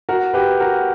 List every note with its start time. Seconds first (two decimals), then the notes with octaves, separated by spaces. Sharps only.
0.09 F#4 A#4
0.34 G4 B4
0.60 F#4 A#4